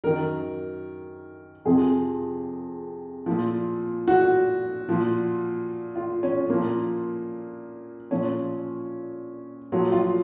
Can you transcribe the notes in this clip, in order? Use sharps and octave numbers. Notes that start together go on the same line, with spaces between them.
F#2 D#3 A#4
F2 C3 F3 G#4
A#2 F3
F#4
A#2 F3
F4
C#4
A#2 F3 A#3
A#2 F3 C#4
A#2 F3 F#3
F4